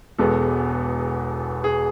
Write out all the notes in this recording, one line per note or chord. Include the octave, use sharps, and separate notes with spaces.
E1 E2 B2 G#3 B3 A4
G#4